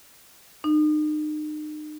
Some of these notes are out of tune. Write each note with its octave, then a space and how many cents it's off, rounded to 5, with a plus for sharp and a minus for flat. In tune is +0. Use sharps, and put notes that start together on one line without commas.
D#4 -40